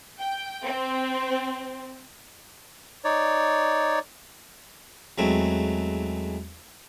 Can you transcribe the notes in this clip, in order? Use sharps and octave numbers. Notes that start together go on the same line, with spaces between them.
G5
C4
D#4 C#5 D5
E2 F#3 G#3 A3 C4